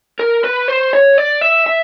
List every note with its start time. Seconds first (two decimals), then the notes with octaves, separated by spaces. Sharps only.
0.19 A#4
0.44 B4
0.68 C5
0.93 C#5
1.18 D5
1.41 E5
1.66 E5